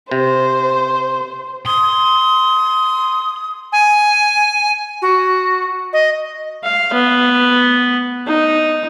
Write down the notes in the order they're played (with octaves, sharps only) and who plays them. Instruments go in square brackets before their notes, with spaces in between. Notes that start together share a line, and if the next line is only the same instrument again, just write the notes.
[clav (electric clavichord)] C3 [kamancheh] C5
[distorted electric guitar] C6 [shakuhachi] D#6
[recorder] G#5
F#4
D#5
[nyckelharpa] F5
B3
D#4